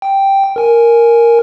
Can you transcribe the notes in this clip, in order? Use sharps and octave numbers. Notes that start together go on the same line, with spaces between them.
G5
A#4 G#5